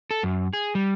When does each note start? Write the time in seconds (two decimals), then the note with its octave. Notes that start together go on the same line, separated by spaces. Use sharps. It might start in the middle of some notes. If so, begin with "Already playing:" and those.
0.11 A4
0.23 F#2
0.53 G#4
0.75 G3